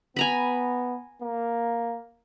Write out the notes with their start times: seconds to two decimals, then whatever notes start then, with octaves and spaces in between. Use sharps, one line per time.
0.16 B3 G#5 A#5 B5
1.21 A#3